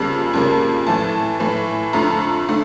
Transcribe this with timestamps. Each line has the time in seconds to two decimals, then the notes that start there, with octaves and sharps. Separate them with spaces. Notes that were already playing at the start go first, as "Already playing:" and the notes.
Already playing: F2 C#3 G3 A#3
0.33 F2 C#3 G3 A#3
0.87 A2 E3 A3 A5
1.40 A2 E3 A3
1.93 F2 D3 A3 A#5
2.48 D3 A3